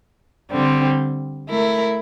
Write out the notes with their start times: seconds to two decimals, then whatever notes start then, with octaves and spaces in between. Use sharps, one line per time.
0.51 D3 G3 C4
1.48 A3 E4 A#4